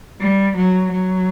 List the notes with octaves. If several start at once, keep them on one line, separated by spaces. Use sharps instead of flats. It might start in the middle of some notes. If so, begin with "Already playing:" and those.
G3
F#3
F#3